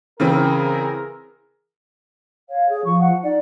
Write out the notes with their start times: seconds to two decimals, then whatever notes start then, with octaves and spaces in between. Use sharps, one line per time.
0.20 C#3 E3 C4 G#4 A#4
2.49 C#5 F5
2.69 G#4
2.84 F3 C#6
2.99 F#5
3.23 D#4 D5